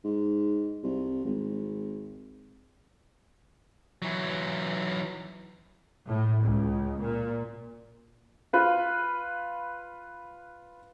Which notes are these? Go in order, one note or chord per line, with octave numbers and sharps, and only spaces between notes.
G#2
C2
G#1
E3 F#3
A2
C#2
A#2
F4 B4 F5